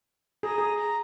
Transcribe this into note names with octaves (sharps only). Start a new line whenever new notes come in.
G#4 A#5
G#4
A#5